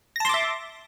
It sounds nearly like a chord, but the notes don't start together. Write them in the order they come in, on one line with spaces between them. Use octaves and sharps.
A#6 A5 C6 D6 E5